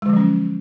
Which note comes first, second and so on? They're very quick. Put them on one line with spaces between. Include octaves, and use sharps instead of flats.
G#3 D3 F3 F#3 C#4